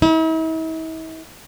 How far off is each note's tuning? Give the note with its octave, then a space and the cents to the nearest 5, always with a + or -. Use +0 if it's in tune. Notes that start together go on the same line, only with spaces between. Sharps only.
E4 -45